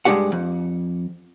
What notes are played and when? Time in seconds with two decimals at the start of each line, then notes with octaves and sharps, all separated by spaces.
0.05 G2 G#3 D4 F#4 G4 F#5
0.32 F2